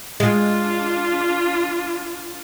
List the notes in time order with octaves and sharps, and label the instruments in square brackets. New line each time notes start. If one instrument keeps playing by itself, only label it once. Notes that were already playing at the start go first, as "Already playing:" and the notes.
[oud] G#3 [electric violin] D4 F4